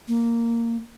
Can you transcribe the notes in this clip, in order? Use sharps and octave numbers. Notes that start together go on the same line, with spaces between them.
A#3